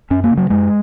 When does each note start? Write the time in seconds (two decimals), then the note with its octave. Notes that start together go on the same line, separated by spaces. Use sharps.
0.10 F#2 C#4
0.24 A#3
0.31 C#3
0.38 F#3
0.50 F#2 G#3